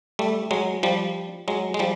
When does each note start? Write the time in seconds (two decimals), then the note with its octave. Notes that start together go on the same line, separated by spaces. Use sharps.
0.19 G3 A3
0.51 F#3 G#3
0.83 F3 G3
1.48 F#3 G#3
1.74 G#3
1.79 F3 G3